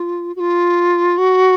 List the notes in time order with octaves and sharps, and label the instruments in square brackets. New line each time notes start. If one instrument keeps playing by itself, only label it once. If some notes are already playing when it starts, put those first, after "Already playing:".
Already playing: [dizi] F4
F#4
F4
F#4